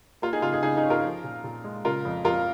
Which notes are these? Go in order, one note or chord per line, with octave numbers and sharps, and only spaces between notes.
A#3 F4
D#4 G#4
C#3 F4
D#4 G#4
C#3 D#4 G#4
D#4 G#4
C#4
F4 A#4
F3
A#2
A#2
G#3
C#3 F4 A#4
F2
F2 F4 A#4